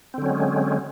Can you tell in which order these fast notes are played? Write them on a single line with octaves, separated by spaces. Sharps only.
C4 D3 F#3 C#4 G#3